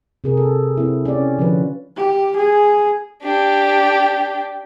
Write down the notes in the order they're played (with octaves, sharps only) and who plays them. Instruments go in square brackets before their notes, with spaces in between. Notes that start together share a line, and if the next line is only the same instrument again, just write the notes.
[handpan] C3 G#4 A#4
A4
C4 E4
C#4 G4 D5
D3 F3 C#4 F4 B4
[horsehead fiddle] G4
G#4
[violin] D4 G4